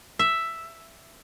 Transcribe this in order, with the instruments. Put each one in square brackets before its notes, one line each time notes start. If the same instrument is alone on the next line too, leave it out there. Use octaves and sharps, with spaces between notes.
[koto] E5